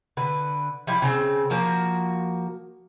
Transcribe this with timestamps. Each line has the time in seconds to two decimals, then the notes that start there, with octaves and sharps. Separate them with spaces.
0.17 D3 B4
0.87 F3 G3 E4 G4
1.02 C#3 C4
1.50 F3 A#3 F#4 A#4